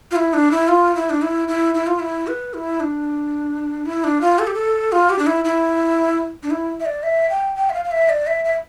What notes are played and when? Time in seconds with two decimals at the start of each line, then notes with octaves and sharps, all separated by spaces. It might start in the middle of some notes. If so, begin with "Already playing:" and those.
0.11 F4
0.16 E4
0.34 D4
0.51 E4
0.68 F4
0.95 E4
1.10 D4
1.22 E4
1.48 E4
1.75 E4
1.87 F4
1.99 E4
2.27 B4
2.54 E4
2.80 D4
3.86 E4
4.04 D4
4.21 F4
4.39 A4
4.47 G4
4.54 A4
4.92 F4
5.10 G4
5.19 D4
5.27 E4
5.45 E4
6.43 D4
6.51 E4
6.80 E5
6.86 D5
7.03 E5
7.30 G5
7.56 G5
7.70 E5
7.74 F5
7.85 F5
7.91 E5
8.09 D5
8.27 E5
8.45 E5